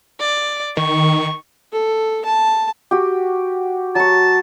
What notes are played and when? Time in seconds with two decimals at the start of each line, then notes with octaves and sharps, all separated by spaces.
0.20 D5
0.77 D#3 C#6
1.72 A4
2.25 A5
2.91 F#4 G4
3.95 F#3 A5 C#6